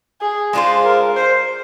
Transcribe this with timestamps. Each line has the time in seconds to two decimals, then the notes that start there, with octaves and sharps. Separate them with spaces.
0.21 G#4
0.53 G#3 D4 F4 C5
0.85 A#4
1.16 C5